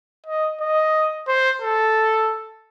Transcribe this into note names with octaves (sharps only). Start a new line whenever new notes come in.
D#5
D#5
C5
A4